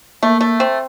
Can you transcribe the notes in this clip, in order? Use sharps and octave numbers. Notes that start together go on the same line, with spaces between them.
A3 A#3
A3
C4